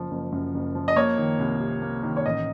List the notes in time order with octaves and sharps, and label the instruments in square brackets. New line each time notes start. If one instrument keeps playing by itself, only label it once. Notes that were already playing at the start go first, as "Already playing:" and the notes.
Already playing: [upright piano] F#1 F3
F#1
F#2
F#1
F3
D#5
A#3 C#5
D#3
C2
C3
A#3
D#3
C#5
A1 D#5